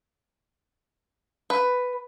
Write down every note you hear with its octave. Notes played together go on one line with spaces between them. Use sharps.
B4